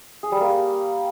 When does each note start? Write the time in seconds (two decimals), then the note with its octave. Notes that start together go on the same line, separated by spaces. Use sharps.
0.23 G#4
0.32 G3
0.41 A#3